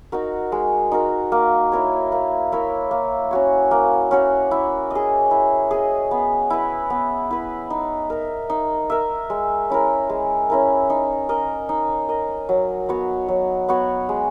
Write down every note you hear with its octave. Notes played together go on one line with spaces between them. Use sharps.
D#4 F#4 A#4
G#3
D#4 F#4 A#4
A#3
E4 A#4 C#5
A#3
E4 A#4 C#5
A#3
C#4 F#4 C#5
A#3
C#4 F#4 C#5
E4
G#4 D#5
E4
G#4 D#5
B3
E4 B4
B3
E4 B4
D#4
A#4 E5
D#4
A#4 E5
G#3
C#4 E4 A#4
G#3
C#4 E4 A#4
D#4
A#4 D#5
D#4
A#4 D#5
F#3
B3 F#4 C#5
F#3
B3 F#4 C#5
G#3